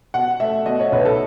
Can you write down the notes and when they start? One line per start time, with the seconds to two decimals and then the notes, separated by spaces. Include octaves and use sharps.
0.14 B2 F#5
0.40 A3 E5
0.66 B2 D#5
0.80 C#5
0.92 B1 B4
1.05 A4